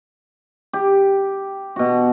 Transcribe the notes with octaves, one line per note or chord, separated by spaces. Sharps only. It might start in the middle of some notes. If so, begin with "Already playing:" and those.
G4
B2 F#4